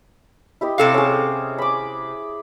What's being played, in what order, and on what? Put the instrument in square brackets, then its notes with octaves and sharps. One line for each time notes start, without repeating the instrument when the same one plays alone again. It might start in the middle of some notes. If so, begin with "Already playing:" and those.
[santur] E4 G4 D#5
[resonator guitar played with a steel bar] C3 A4 F5
[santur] C#4 G#4
B5 D6